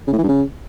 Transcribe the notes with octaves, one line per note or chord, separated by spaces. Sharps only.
C#3
A2
E3
G2
C#3